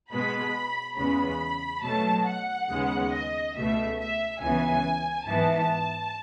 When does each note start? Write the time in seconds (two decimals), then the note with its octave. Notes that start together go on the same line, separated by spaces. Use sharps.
0.11 B2 G#3 B3 B5
0.97 E2 C#3 G#3 B3 B5
1.83 B2 F#3 A3 A5
2.26 F#5
2.69 D#2 C#3 G#3 B3
3.12 D#5
3.55 C#2 B2 A3 E5
3.99 E5
4.40 C#2 C#3 E3 B3 G#5
5.27 G#2 E3 B3 A5